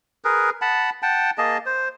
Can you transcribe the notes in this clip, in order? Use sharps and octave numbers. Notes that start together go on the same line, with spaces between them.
G#4 A#4 B4
F#5 A5 B5
F#5 G5 A5
A#3 G#4 D#5 A5
C5